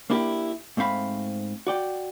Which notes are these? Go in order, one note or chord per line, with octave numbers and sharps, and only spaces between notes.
A#3 D4 E4 F4 G4
G#2 A3 C4 F5 B5
F#4 D5 G5